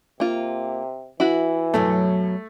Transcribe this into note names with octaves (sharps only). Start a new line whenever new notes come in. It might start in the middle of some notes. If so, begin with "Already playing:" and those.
C3 A#3 F4
E3 E4 F#4
F#2 B2 F#3 A3